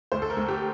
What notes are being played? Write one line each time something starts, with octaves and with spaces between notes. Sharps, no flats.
D2 C5
A4
A#4
D2
G4